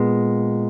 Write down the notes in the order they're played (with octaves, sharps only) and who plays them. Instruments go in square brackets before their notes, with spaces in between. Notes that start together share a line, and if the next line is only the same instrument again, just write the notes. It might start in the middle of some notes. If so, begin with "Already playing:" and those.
Already playing: [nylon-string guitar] A#2 G#3 B3